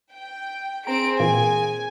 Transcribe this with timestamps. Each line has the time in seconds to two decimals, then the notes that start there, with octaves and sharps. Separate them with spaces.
0.12 G5
0.87 C4 G#4 A#5 D7
1.20 A#2 E3 A#3 G#5